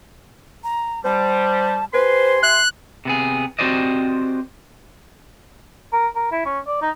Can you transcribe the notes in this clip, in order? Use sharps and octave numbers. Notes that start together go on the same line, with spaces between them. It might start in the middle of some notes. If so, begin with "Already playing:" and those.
A#5
G3 C5 A5
G4 B4 C5 G#5 C6
E5 F#6
C3 B3 G#4
C4 F#4 G4 C5 D5 D#5
A#4
A#4
E4
C#4
D5
D#4